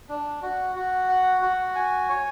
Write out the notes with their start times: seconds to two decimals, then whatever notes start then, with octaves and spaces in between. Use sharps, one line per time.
0.09 D4
0.42 F#4
0.75 F#4
1.09 F#5
1.42 F#4
1.75 G#5
2.10 C#5